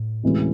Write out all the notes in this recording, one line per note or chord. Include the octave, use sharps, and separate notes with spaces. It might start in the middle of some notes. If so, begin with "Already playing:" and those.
Already playing: A2
D2 C3 E3 G#3 C#4